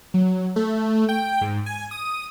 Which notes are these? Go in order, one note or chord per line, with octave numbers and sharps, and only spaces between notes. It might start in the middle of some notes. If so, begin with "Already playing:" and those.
F#3
A3
G5
G#2
G#5
D#6